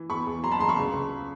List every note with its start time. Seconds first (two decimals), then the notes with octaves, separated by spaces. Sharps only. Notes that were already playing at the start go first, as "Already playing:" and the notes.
Already playing: E3
0.10 E2 B5 C#6
0.26 E2
0.44 F#3 A#5 C6
0.51 A5 B5
0.60 E2 A#5 C6
0.69 B5 C#6
0.76 C#2
0.93 C#2